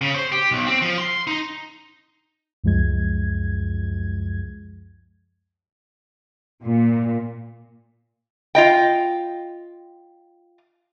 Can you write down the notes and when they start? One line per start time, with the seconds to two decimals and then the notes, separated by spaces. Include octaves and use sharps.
0.01 C#3
0.15 C5
0.32 G4
0.51 B1
0.66 C4
0.82 F3
0.98 C6
1.27 D#4
2.64 C#2 F#2 F3 G#3 G#6
6.64 A#2
8.55 F4 D#5 G5